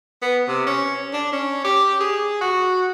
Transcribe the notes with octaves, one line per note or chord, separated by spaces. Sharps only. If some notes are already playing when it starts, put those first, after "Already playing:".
B3
C3
C#4
D4
C#4
G4
G#4
F#4